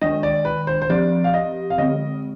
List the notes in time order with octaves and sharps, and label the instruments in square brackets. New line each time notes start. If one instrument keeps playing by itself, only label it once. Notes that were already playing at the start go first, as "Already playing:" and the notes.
[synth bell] D#3 G#3 D4 [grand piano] D#5
[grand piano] D5
B4
C5
C5
[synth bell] F3 C4 G4 [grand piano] D5
[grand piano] F5
D#5
F5
[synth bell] D3 G#3 C4 [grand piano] D#5